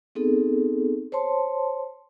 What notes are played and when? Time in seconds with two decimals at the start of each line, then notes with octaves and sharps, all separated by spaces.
0.15 B3 C4 D#4 G#4 A4
1.12 C5 C#5 A5 C6